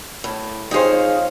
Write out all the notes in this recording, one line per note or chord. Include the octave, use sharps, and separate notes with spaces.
A2
F2 D#4 G#4 C5 C#5 F5